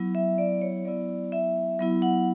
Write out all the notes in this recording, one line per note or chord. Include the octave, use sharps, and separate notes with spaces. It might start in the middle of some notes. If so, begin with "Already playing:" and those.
Already playing: F#3 B3 E4
E5
D5
C#5
F#3 B3 E4 D5
E5
F#3 B3 E4
F#5